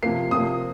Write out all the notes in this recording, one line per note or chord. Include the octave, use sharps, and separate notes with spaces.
C3 F3 A#3 C7
C3 F3 A#3 D#6